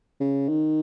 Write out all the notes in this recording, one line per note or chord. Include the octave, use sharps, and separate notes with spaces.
C#3
D#3